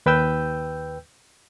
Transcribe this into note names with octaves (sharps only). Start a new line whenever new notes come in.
D#2 B4 G5 E6 G6